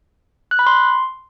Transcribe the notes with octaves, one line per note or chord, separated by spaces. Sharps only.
F#6
B5
C6